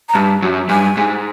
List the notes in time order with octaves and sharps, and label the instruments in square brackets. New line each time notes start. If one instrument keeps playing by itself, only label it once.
[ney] A#5
[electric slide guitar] G2 [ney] A5
[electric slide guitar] F#2
[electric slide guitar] G2 [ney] G#5
[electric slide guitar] G#2